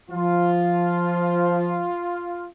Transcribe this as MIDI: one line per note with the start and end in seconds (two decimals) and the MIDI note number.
0.11 1.87 53
0.11 2.47 65